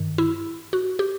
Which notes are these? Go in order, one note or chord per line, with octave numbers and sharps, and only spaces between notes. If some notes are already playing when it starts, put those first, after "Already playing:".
Already playing: G2 D#3
E4
F#4
G4